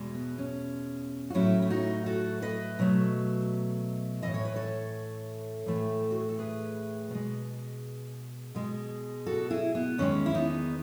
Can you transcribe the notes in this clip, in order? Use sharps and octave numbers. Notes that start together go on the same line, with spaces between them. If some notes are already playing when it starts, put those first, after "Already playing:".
Already playing: E2 B2 G#3
B3
C#4
F#4
A2 F#3 A3 C#4 E4
E4
D#4 F#4
F#4 A4
B4 D#5
B2 F#3 A3
A2 E3 G#3 D#5
C#5
B4
A4 C#5
A2 E3 A3
F#4
G#4
A4
G#4 B4
B2 G#3
B2 G#3
F#4 A4
E4 G#4
B3
E2 D#3 G#3 C#4
E4
B3 D#4